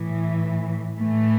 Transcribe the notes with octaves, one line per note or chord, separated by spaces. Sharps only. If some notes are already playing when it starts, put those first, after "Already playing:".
Already playing: A2 E3
A2 E3 A3